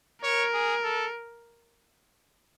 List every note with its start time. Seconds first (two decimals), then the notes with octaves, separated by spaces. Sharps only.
0.23 A#4 C#5
0.54 G#4
0.84 A4